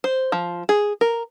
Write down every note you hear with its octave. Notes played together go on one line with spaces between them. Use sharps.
C5
F3
G#4
A#4